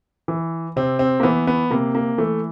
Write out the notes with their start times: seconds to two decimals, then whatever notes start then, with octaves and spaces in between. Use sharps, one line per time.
0.28 E3
0.76 C3 C4
0.99 C4
1.20 A#3
1.23 E3 B3
1.47 B3
1.71 C3 A#3
1.95 A#3
2.18 E3 A3